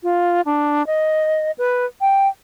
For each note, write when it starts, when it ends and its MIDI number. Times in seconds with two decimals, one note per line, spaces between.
0.03 0.41 65
0.45 0.85 62
0.87 1.51 75
1.58 1.85 71
2.01 2.28 79